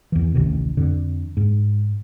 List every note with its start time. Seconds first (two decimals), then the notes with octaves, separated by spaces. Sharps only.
0.12 E2 E3
0.34 A1 D2 C3 D#3
0.77 F2 D3
1.37 G#2